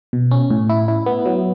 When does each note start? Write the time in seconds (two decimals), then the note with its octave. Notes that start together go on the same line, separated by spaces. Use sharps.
0.13 B2
0.31 C#4
0.51 A2
0.70 E4
0.88 E4
1.06 B3
1.26 F#3